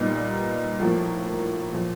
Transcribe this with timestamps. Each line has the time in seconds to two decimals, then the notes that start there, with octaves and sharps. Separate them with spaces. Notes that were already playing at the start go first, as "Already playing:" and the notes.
Already playing: A#2 G3 B3 D#4
0.79 A2 F3 A#3
1.72 A#2 F3 A3